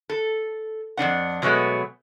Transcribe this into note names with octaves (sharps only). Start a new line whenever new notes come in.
A4
F2 D#3 D4 F#5
B2 F#3 G#3 A3 B3